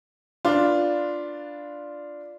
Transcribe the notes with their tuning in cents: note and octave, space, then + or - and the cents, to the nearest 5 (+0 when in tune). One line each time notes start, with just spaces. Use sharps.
D4 +0 F4 +0 B4 +0